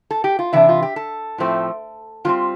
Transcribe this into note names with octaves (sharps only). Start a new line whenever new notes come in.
A4
G4
F4
C3 E3 D4 E5
F4
G4
A4
A2 F3 A3 C4
D3 G3 C4 F4